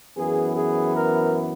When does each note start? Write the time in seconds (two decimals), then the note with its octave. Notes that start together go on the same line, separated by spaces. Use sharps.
0.16 F#2 E3 B3 G#4
0.56 G#4
0.95 A#4